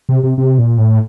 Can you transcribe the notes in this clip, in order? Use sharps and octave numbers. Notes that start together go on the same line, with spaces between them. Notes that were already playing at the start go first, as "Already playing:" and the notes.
C3
C3
C3
A#2
A2